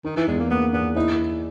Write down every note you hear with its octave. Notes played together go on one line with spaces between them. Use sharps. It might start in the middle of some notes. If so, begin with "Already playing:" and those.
D#3 D#4
E3
E2 G#3
A#3
A#3 B3
E2 B3
D#4 E4